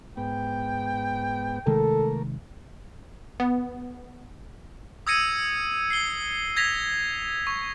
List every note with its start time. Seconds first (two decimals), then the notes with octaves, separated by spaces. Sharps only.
0.17 G#2 B3 G5
1.67 C3 D#3 G#3 A3 A4 A#4
3.40 B3
5.07 D#6 E6 G#6 A#6 C#7 D#7
5.90 C7 G7
6.56 G#6 A#6 B6 F7
7.47 C#6